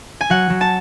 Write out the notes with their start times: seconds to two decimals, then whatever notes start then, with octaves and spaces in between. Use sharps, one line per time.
0.21 G#5
0.30 F#3 F#5
0.50 F#3
0.61 A5